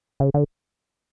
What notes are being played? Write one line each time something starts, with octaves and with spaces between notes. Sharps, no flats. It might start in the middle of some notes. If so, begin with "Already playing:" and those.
C#3
D3